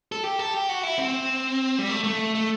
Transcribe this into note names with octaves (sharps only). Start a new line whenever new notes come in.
A4
G4
A4
G4
F#4
E4
C4
G3
A3
A3
A3